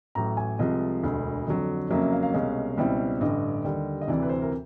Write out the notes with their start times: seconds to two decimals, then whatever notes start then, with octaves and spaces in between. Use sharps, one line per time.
0.15 A1 A2 F#3 A#5
0.37 G#5
0.59 C2 C3 F3 G#3 D#5
1.03 E1 D2 D3
1.47 F2 D3 F#3
1.89 F2 C#3 F#3 A#3 C#4 E5
2.02 E5
2.12 F5
2.23 F5
2.34 C2 B2 G#3 C#4
2.77 C#2 B2 G3 C4 E4
3.20 A1 G2 D3 D#5
3.65 D#2 D3 G3
4.01 D#5
4.07 D2 C3 E3 D5
4.22 B4
4.29 C5
4.42 A#4